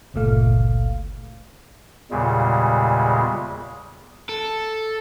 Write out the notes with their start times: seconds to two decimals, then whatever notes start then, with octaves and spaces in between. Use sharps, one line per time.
0.14 G1 C#2 A#2 A3 F5
2.11 E2 A#2 C#3 G3 G#3
4.29 A4